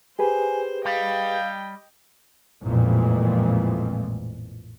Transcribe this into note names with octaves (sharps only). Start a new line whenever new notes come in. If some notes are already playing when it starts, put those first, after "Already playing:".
G4 G#4 B4 C5 G#5
G3 D#5 F5 G5
A1 F2 A#2 E3 F3 G#3